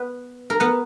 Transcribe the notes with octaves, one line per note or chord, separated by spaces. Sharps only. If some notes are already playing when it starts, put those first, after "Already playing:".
Already playing: B3 B4
A#4
B3 B4